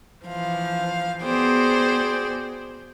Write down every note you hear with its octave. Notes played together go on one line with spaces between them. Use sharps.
E3 F3 F5
B3 F#4 G#4 C5 D5 G5